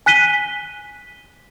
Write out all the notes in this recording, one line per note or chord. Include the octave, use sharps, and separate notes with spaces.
G#5 F#6 B6 D#7 G7